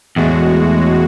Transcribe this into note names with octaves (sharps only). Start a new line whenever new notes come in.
E2 A2 G#3 F#4